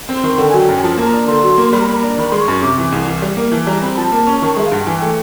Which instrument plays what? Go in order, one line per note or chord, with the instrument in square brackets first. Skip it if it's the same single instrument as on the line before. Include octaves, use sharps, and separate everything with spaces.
[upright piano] C4
[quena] C6
[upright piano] D#3
[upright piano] D3 [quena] G5
[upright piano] F#3 [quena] G#5
[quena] G5
[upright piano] F#2
[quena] G#5
[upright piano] F3 [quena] A5
[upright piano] A#3
[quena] A#5
[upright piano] D4
[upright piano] D3 [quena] C6
[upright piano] F#3
A#3
[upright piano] G3 [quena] B5
[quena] A#5
[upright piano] A#3 [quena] B5
[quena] A#5
[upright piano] D4
[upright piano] D#3 [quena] B5
[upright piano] G#3 [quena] C6
[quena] C#6
[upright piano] F#2
[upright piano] C3 [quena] D6
[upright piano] E3
C2
E3
G3
A#3
[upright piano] E3 [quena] A5
[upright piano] G3 [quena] A#5
[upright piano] C4 [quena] B5
[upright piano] F3 [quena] A5
[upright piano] A#3
C#4
D#3
[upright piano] G#3 [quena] E5
[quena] F5
[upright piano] G2 [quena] F#5
[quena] G5
[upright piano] E3 [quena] G#5
[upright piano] A3 [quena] G5